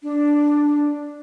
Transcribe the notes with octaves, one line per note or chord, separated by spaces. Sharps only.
D4